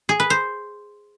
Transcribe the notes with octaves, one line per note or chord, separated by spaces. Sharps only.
G#4
B4
C5